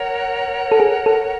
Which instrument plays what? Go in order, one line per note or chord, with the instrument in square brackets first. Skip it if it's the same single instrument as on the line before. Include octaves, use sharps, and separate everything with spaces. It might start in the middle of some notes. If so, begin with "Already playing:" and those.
Already playing: [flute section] A#4 C#5 F#5
[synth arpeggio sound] A4
G#4
A4